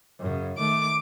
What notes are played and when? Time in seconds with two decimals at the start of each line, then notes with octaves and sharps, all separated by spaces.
0.19 F#2 C#3
0.58 D#3 A3 D6